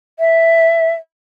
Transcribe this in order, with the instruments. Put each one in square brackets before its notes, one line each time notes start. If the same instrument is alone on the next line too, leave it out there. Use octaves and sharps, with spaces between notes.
[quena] E5